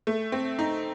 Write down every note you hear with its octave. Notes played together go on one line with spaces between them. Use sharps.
A3
C4
D#4